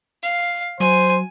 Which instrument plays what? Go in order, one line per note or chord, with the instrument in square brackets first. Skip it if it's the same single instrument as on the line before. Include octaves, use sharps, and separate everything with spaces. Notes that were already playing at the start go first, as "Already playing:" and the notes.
[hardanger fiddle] F5
[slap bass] F#3 [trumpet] C5 [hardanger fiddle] G#5